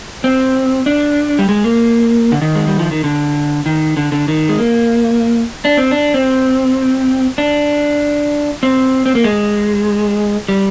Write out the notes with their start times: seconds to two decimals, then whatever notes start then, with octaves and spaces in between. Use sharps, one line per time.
0.24 C4
0.86 D4
1.39 G3
1.49 G#3
1.64 A#3
2.32 D3
2.41 D#3
2.55 G#3
2.67 G3
2.79 F3
2.91 D#3
3.04 D3
3.66 D#3
3.97 D3
4.12 D3
4.28 D#3
4.49 G#3
4.59 A#3
5.65 D4
5.77 C4
5.91 D4
6.14 C4
7.38 D4
8.63 C4
9.06 C4
9.15 A#3
9.24 G#3
10.49 G3